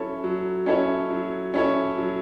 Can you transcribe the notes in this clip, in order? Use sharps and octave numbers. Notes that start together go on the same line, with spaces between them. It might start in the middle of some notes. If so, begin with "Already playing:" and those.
Already playing: F#3 C#4 E4 A4 C#5
F#3
C#4 E4 A4 C#5
F#3
C#4 E4 A4 C#5
F#3